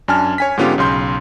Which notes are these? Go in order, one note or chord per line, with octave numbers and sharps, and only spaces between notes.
F#2 D4 G#5 A5 F6
C#5 G#5 B6
G#2 D3 B3 C#4 F4 G4
B1 C#3 C6 G6